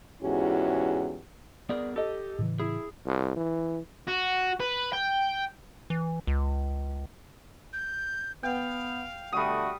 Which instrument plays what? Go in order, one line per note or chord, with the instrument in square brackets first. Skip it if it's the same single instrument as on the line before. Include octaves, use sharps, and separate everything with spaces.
[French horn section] E2 G#2 C#4 E4 F#4 G4
[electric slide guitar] B3 G#4 A#4 [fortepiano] D5
[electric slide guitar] G4 [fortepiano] A4 D#5
[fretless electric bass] A2 C#3 E3
[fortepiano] E4 [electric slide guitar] G#4
[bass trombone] C2
E3
[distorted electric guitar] F#4
B4
G5
[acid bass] E3
C#2
[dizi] G6
[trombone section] B3 [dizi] F5 [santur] G5
[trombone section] B2 D3 A3 [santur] G3 D#6 [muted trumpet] F#4